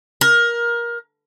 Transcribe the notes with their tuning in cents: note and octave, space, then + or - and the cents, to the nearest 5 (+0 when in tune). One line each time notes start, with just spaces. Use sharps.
A#4 +20